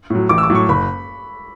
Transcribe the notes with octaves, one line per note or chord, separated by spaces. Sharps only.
A2 F#3
A1 D6
E6
D6
A2 F#3
C#6
F#1 B5